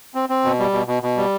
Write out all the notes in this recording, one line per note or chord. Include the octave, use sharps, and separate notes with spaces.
C4
C4
B2
G3
B2
B2
B2
G3